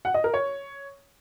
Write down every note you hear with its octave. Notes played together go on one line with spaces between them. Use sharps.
F#5
D#5
A#4
C#5